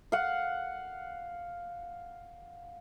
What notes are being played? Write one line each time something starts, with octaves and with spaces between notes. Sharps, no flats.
F5 F#5